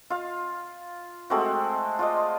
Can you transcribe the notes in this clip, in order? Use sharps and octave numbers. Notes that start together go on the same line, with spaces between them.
F4 F5
G#3 A3 C4 F#4
F4 D5 D#5